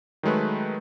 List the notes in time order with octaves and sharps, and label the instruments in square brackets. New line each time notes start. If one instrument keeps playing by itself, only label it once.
[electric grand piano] D#3 F#3 G#3 A3 B4